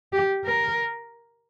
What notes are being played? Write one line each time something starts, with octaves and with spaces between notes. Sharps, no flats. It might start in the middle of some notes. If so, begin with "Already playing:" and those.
G4
A#4